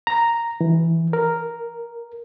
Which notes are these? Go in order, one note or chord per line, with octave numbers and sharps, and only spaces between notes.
A#5
E3
A#4